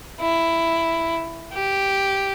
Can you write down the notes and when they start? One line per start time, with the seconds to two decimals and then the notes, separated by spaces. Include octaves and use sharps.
0.20 E4
1.53 G4